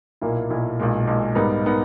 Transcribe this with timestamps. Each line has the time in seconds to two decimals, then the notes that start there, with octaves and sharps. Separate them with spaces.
0.21 B1 A#2 A#3 E4
0.50 B1 A#2 A#3 E4
0.79 B1 A#2 G#3
1.07 B1 A#2 G#3
1.35 G#2 G3 B3 D#4 A#4
1.66 G3 B3 D#4 A#4